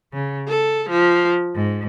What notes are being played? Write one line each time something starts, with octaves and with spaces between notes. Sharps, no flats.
C#3
A4
F3
G#2